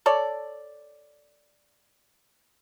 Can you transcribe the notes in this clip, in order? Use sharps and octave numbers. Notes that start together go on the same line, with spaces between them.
A4 C#5 D5